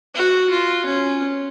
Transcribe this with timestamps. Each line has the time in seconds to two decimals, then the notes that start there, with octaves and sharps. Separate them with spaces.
0.14 F#4
0.50 F4
0.86 C#4